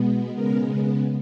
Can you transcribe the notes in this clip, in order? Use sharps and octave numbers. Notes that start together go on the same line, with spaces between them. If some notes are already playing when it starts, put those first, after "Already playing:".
Already playing: B2 G#3 B3
C#3 G#3 B3 A#4